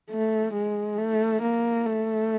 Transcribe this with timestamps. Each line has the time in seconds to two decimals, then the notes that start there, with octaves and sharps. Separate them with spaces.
0.10 A3
0.54 G#3
0.98 A3
1.42 A#3
1.86 A3